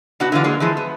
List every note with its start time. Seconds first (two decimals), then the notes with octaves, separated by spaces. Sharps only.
0.20 B2 B3 D4 F#4
0.32 D3 E3 G#3 F4 D5
0.44 F#3 G#3 A#3
0.60 E3 F3 G#3
0.77 B3